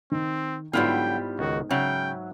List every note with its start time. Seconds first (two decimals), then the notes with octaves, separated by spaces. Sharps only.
0.12 D#3 C4
0.73 G#2 D3 F#3 G3 B3 E4 F4 G5
1.39 C#2 D#3 F#4
1.71 C#3 F#3 E5 F#5 G5